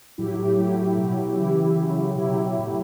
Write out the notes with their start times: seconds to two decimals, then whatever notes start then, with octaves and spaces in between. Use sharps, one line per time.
0.18 A2 F#3 E4 G4
0.38 E4 G4
0.57 A2 F#3 E4 G4
0.97 B2 F#3
1.37 C#3 E3 E4 G4
1.76 C#3 F#3
2.15 B2 F#3 E4 G4
2.55 A2 F#3